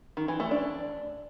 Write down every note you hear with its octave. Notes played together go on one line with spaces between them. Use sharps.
D#3
E3
A3
D4